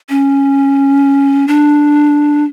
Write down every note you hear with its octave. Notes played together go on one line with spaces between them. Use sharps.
C#4
D4